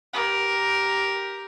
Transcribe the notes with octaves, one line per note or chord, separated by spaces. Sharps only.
G4 A#4